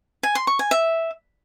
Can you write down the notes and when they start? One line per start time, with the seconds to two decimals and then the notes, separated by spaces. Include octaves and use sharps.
0.23 G#5
0.35 C6
0.47 C#6
0.59 G#5
0.71 E5